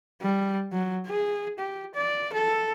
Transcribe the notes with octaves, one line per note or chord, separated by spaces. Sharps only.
G3
F#3
G#4
G4
D5
A4